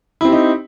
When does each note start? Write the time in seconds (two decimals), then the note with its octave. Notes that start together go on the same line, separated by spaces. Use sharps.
0.21 E4
0.25 C4
0.28 G4
0.32 D#4